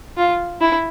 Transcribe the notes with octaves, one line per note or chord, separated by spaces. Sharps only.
F4
E4